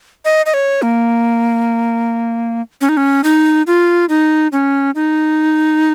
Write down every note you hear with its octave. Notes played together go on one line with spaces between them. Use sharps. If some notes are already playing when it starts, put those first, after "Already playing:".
D#5
D#5
C#5
A#3
C#4
D#4
C#4
D#4
F4
D#4
C#4
D#4